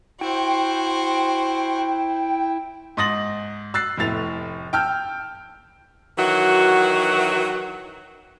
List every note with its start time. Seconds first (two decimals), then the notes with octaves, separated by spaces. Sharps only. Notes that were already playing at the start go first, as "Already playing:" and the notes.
0.21 E4 F#4 C5 G5
2.97 G#2 C6 D#6 A6 A#6 F#7
3.74 E6 F#6 A6 C7
3.97 F1 A2 E4 A6 F7
4.73 G5 A5 E6 F6 G6
6.18 D#3 E3 F#3 F#4